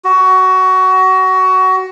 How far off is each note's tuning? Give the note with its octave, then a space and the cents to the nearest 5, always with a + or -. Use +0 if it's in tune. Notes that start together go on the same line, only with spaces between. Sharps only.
F#4 +20